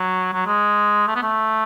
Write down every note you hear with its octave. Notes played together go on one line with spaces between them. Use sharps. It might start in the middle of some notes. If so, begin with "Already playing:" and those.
Already playing: F#3
F#3
G#3
A3
B3
A3